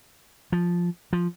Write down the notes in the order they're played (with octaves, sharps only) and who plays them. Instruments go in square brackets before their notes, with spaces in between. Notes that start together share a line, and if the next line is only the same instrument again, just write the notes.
[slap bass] F3
F3